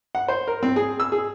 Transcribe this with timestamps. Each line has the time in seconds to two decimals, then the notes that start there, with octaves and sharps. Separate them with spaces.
0.15 F#5
0.28 C5
0.48 A#4
0.63 C4
0.76 G#4
1.00 E6
1.12 G#4